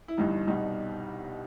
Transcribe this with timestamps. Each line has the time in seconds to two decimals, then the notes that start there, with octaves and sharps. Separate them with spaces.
0.08 E4
0.17 G1 G2 E3 G3 D#4
0.47 C2 B2 G3 D#4